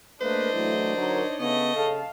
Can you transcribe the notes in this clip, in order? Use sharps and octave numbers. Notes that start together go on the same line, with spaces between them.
A3 A#3 D4 B4 C5 D#5
E3 F#3 A3 E4
D3 F#3 D#4 A#4 C#5
C#3 A3 B3 D#5
C#3 A4 F5 A5